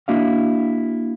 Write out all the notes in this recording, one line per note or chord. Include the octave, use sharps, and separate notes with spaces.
A#3 D4 E4 F#4 D#5 F5